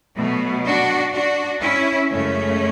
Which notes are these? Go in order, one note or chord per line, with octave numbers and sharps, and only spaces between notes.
B2 F#3 A3
D4 F#4
D4 F#4
C#4 E4
F#2 C#3 G#3 A3 C#4